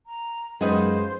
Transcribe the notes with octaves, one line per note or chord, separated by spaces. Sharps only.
A#5
F#2 G#3 D#4 F4 F#4 B4 C5